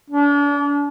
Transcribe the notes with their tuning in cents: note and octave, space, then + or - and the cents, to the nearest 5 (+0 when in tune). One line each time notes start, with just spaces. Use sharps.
D4 -35